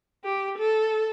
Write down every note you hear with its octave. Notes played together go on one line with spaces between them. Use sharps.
G4
A4